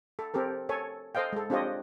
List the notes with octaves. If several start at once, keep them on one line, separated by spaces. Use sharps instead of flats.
A4
C4 G4 A4 A#4
A4 C#5 G#5
A4 C5 D#5 F5 G5
G#3 A4
C4 D4 F4 G4 C#5 D#5